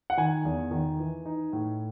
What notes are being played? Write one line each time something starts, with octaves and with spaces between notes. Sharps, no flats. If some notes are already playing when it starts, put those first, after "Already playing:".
F#5
D#3 G#5
E2
D#3
E3
D#4
A2